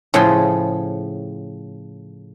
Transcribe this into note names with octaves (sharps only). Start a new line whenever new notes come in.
A2 C#3 F3 G#4 B5 C6